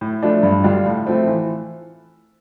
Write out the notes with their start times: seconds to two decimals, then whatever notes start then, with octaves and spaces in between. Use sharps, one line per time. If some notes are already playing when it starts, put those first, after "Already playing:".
0.01 A2
0.23 F3 A3 D4
0.43 G2
0.64 D3 G3 D4 F4
0.86 A2
1.06 F3 A3 C4
1.28 E3